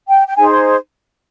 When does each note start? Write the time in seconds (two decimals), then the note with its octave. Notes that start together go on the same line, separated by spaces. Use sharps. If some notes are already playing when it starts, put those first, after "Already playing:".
0.09 G5
0.27 G5
0.36 D#4 G#4 C5 G#5
0.50 C6